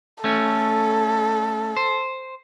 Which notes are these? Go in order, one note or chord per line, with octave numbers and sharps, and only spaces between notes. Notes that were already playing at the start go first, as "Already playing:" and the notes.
A3 C#4 A4
C5